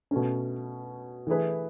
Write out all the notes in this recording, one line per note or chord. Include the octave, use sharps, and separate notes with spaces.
B2 A3 C#4
E3 A3 E4 G#4 B4